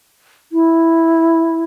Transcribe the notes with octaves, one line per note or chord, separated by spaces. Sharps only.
E4